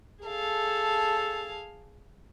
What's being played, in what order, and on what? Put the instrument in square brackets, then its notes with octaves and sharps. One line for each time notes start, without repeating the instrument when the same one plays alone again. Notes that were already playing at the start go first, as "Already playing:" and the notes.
[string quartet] G#4 F5 A5 [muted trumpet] A4